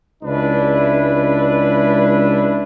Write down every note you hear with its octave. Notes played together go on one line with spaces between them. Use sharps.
C#2 G#3 D4 E4 B4